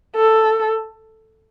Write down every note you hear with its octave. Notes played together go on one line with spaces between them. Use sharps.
A4